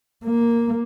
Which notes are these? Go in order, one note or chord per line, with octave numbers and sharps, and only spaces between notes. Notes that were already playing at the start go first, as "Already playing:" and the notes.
A#3